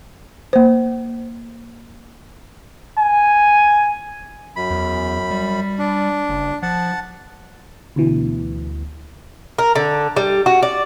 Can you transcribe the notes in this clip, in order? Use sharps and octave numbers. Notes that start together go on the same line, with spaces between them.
A#3 C5
G#5
F#2 B5
E2
G3
D4
F#1
F3 F#5 A5
D2 B2 E3
A#4
D3
G3
F#4
D5